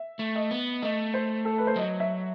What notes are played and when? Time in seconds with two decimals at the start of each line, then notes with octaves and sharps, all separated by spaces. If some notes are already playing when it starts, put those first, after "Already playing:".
Already playing: E5
0.19 A3
0.35 D#5
0.51 B3
0.82 A3 D#5
1.14 C5
1.45 A4
1.58 B4
1.67 C5
1.76 F#3 D#5
2.00 E5